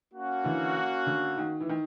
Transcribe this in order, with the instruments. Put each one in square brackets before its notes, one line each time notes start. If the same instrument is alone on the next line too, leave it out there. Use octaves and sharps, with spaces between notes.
[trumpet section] A#3 C#4 F#4
[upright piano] D3 E3
D3
D#3
E3
D#3